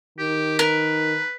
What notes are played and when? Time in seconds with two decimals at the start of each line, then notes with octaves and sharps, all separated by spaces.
0.18 D#3 G4
0.59 A#4 B4